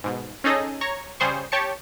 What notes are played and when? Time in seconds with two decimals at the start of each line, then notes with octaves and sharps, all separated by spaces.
0.04 G#2 B2
0.44 C#4 D#4 G#4 A4 D#5
0.81 C#5 A#5 C#6
1.20 C#3 G3 G#4 C5 C6 C#6
1.52 G4 C#5 A5 C#6 C#7